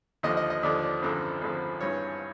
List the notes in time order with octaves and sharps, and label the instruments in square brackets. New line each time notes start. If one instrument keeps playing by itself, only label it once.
[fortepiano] D#2 D3 F3 D#5
D#5
D#5
D#2 D3 F3 D5
D5
G#1 F#2 D3 F3
G#1 F#2 D3 F3
G#1 G2 E3 C#5